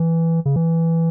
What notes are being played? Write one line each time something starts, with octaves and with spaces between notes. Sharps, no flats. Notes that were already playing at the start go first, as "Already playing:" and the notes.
Already playing: E3
C#3
E3